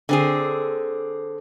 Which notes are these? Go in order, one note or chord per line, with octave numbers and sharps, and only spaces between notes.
D3 C4 G#4